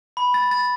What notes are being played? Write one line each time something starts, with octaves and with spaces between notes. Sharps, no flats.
B5
A6
A6